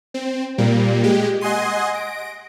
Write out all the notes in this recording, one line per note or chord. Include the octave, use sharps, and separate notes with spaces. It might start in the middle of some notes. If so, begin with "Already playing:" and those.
C4
A#2 G3 A#3
G#3 G4
D#5 F#5 G#5 C6 D#6
A#6 D7